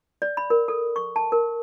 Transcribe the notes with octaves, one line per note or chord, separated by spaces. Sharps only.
D5
B5
A#4
A4
C#6
A5
A#4